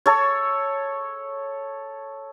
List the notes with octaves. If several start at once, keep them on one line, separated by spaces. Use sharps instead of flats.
A4 C#5